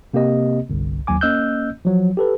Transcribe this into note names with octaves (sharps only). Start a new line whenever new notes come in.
C3 A#3 C4 G4 D#5
G1 C2
G#1 D#2 F#3 G#5 D6
A#3 C#4 D#5 E6 F#6 G6
F3 F#3
G4 A4 B4